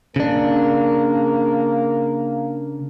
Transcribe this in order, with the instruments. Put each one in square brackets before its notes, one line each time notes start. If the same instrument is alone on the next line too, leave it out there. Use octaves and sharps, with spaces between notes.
[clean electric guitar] C#3 D4 [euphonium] A#3